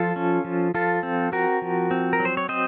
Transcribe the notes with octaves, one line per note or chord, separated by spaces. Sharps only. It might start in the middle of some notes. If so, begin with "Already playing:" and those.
Already playing: F3 F4 A4
C#4
F3
F3 F4 A4
C4
C4 F#4 A#4
F3
C4
A#4
F#3
C5
C#5
C4 C5 D#5